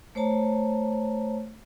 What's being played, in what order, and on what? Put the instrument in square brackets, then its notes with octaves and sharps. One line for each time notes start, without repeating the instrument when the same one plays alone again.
[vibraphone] A3 C5 C#5 A5 A#5